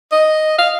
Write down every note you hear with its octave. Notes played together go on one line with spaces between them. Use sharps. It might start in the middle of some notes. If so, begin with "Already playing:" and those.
D#5
F5